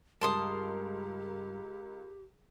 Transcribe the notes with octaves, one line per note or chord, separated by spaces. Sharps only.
C#2 G2 G4 A#4 A5 C6 D#6